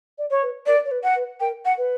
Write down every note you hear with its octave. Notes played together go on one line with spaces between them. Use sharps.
D5
C#5
B4
A#4 D5
C#5
B4
F#5
B4
A#4 G5
F#5
B4